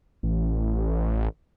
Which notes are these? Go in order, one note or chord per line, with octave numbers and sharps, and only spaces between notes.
A1